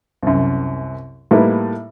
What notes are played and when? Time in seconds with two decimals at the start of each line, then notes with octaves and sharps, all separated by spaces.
0.23 C2 F#2
1.31 A2 G3 A#3 D#4 E4 B4